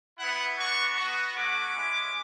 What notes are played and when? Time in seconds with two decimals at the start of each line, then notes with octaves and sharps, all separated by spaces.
0.18 B3 E4 F#5
0.57 B3 D4 F#4 C#6
0.96 B3 F#4
1.35 A3 C#4 F#4 D6
1.74 G#3 C#4 E4